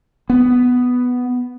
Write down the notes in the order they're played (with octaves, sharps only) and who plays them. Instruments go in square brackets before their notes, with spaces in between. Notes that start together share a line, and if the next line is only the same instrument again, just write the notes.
[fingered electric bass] B3